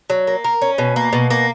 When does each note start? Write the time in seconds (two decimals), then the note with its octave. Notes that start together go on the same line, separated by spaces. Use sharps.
0.10 F#3
0.27 A#3
0.44 A#4
0.62 C#4
0.78 B2
0.96 A#3
1.13 B2
1.30 A#3